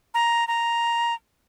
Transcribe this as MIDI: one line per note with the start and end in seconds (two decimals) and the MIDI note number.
0.14 0.47 82
0.48 1.14 82